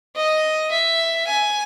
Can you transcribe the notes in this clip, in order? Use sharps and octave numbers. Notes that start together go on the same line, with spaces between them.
D#5
E5
G#5